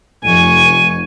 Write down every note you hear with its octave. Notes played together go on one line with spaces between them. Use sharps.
F1 G#5 C#6 D#7